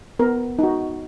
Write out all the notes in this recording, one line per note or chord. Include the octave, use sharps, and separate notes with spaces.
B3 A#4
D#4 F#4